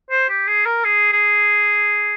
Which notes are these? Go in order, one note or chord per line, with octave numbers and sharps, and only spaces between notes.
C5
G4
G#4
A#4
G#4
G#4